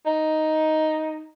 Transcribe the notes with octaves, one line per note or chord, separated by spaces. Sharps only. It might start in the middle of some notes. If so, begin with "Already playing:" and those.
D#4